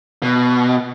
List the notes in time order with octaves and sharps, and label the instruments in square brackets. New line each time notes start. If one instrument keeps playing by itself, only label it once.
[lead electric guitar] B2